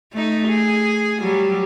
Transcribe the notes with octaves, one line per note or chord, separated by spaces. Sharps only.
A3 D#4
G#4
F#3 G3